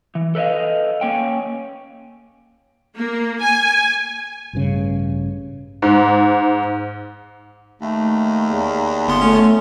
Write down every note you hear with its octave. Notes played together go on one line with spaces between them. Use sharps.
E3
A4 B4 D5 D#5 F5
A#3 C#4 G5
A#3
G#5
A1 G2 C#3
G#2
D#2 A3
E2
G1 B3 C6
A3 C#4